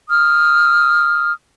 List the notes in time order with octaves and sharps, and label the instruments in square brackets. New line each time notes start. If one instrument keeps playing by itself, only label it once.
[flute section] D#6 F6